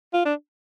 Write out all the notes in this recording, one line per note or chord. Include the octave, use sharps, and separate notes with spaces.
F4
D4